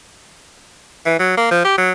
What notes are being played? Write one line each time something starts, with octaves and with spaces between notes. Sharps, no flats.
E3
F#3
A#3
F3
G4
F#3